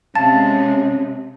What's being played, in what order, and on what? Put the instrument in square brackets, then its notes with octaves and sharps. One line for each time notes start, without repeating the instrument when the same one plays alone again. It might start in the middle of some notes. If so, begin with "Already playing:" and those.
[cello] C3 G#3 [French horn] C#4 [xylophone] F5 A5 A6